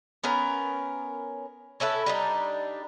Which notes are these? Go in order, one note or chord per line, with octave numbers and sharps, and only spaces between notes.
B3 C#4 A#4
C#4 E4 A4 B4
G3 D4 D#4